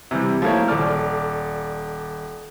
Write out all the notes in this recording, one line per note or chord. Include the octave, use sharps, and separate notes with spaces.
C3 E3 G3
F3 A3 A#3 E4 C#5
D#1 A4 D5 F6